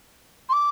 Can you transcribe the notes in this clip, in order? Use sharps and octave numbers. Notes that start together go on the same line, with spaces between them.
C6
D6